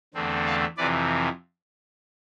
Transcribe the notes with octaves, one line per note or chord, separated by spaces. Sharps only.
E2 D3 A3 C4
F5 A5
F2 C3 E3 B4 D5